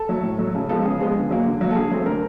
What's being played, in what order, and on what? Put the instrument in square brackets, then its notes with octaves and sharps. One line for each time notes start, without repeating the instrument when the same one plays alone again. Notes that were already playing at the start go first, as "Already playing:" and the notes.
Already playing: [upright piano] A4
F#3 A3
A2
F#3 A3
C#3 A4
F3 G#3 B3 A4
C#3 G#4
F3 G#3 B3
D3
F#3 A#3
D3
F#3 A#3
A4
D3 G#4
F#3 A3 C4
D3 A#4